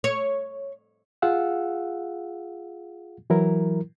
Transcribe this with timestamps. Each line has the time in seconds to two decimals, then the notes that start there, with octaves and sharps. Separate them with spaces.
0.04 C#5
1.22 F4 G#4 F5 F#5 E6
3.30 E3 F#3 E4 A#4